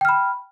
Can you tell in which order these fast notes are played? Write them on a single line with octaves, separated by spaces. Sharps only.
G5 F6 B5